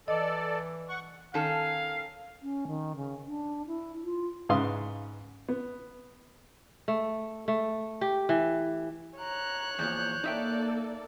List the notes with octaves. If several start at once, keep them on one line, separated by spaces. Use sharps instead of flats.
E3 A4 D5 D#5
F#5 C#6
D#3 C#4 A4 F5
C#4
D#3
C#3
D4
E4
F4
G#2 C#3 B4 F5 C6 D#6
B3
A3
A3
G4
E3
C#5 A#5 F#6
E2 A#2 F3 G6
A#3 D#4 A4 D5 E5 G5